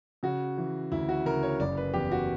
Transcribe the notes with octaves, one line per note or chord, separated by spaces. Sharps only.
C#3 F#4
E3
D2 E4
F#4
C#3 A#4
C#5
F#1 D5
B4
E2 G4
F#4